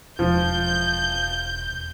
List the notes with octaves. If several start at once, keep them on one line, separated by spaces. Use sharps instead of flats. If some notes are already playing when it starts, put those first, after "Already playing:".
E1 F3 G6